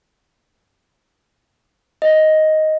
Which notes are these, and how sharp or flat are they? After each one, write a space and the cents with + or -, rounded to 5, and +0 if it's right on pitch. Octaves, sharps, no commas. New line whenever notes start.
D#5 +5